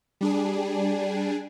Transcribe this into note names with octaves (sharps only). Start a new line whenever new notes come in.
G3 D4 G#4